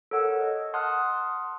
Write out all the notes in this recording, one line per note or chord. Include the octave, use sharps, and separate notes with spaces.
A4 A#4 C#5 F#5 E6
D#5
F#5 A5 C6 D#6 F6 F#6